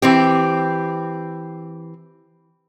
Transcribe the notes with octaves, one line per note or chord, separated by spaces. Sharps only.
E3 C4 G4